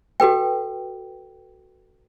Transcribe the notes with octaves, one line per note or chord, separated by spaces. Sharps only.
F#4 A4 B4 G5